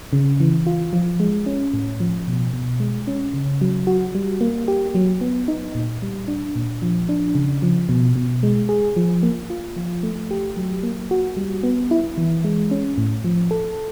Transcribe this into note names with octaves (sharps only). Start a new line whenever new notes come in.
C#3
E3
F4
F3
G#3
C#4
A2
F3
B2
B2
G#3
C#4
C#3
F#3
F#4
G3
A#3
G4
F#3
B3
D#4
A#2
G3
D4
A#2
F3
D4
C#3
F3
B2
B2
G#3
G#4
F3
A#3
F4
F3
A3
G4
F#3
A#3
F#4
G3
B3
E4
E3
G#3
C#4
A2
F3
A4